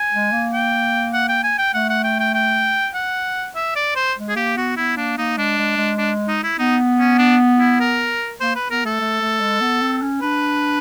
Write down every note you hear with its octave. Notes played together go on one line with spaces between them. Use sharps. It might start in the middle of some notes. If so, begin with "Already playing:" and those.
Already playing: G#5
G#3
A#3
G5
F#5
G5
G#5
G5
A3 F#5
F#5
G5
G5
G5
F#5
E5
D5
C5
G#3
G#4
A#3 G4
B3 F#4
B3 E4
A#3 D4
A#3 D#4
G#3 D4
G#3
G#3
D4
D#4
E4
B3 D#4
C#4
D4
E4
A#4
A#3 C5
B4
B3 A#4
A3 A4
A3
A3
G#3
B3
C4
C#4
D4 B4